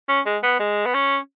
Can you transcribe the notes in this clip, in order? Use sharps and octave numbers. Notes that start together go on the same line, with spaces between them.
C#4
G#3
B3
G#3
B3
C#4